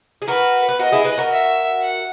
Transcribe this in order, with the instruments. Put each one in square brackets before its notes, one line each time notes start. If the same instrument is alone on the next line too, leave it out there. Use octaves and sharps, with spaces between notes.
[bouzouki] G#4
[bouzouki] F#4 A#4 [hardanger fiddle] B4
[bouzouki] B4
[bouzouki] F#4 A#4 [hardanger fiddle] D#5
[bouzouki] E4 G#4
G#4 B4
F#4 A#4
[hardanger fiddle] E5
F#5